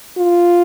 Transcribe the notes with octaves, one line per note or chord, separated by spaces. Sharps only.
F4